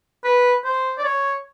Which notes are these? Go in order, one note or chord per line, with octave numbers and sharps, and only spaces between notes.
B4
C5
D5
C#5